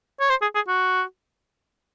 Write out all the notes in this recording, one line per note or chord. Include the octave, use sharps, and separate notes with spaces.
C#5
C5
G#4
G#4
F#4